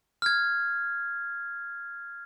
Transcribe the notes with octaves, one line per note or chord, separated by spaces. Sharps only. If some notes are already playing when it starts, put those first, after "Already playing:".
F6 G#6